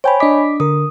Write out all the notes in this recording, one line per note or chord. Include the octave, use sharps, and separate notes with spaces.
C5 C#5 G5 G#5 B5
D4 D#5 D6 B6
D3 A#4 D#6